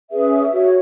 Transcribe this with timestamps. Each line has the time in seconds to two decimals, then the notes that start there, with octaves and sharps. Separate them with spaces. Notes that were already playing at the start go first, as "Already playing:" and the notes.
0.11 C#4 G#4 B4 E5
0.53 F#4 C#5